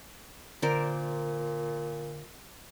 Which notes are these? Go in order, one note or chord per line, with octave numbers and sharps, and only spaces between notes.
A#2 D3 A#4 C5 D5